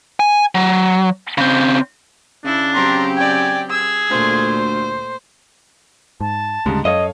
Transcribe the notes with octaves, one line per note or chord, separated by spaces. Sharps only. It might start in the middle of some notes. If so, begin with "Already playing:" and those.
G#5
F#3
C#3 C4
C#3 D4 E4
F#3 C4 G4 A#5 C6
D5 G5 G#5
G#4 E6
D2 A#2 A3 F4 C5
G#2 A5
D2 G#2 C#3 G3 G#3
F#2 A4 C#5 D#5 F5